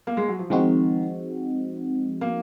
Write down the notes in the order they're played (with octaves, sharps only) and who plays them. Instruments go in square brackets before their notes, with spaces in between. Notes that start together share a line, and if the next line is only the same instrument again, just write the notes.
[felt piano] A#3
G#3
F#3
F3
[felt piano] D#3 [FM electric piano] F3 G#3 C4 D#4 F#4
[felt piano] A#3